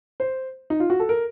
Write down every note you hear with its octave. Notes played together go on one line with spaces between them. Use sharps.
C5
D#4
F4
F#4
A4
A#4